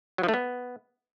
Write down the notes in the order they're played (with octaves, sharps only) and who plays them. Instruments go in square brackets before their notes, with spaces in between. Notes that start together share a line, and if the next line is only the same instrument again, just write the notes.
[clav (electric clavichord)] F#3
F3
A3
B3